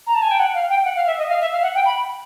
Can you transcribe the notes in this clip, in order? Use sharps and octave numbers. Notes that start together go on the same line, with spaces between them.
A#5
A5
G#5
G5
F#5
F5
G5
F#5
F5
E5
D#5
F5
E5
F5
F#5
G5
B5